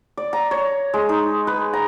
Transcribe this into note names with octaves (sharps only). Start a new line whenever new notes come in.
D5
A#5
C#5
G#3
D#4
B4
A#5